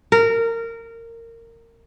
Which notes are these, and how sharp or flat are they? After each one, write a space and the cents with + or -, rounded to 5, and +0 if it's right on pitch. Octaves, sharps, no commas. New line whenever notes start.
A#4 -20